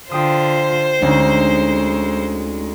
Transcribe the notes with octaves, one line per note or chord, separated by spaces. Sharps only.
D3 F4 C5 G5 D#6
D2 G#3 C#4 D#4